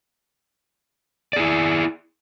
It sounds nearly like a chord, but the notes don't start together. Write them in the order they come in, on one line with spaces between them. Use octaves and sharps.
D5 G#4 E4